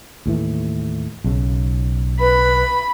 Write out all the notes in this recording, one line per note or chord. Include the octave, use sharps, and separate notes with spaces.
D#2 A2 E3
B1 C#3
B4 B5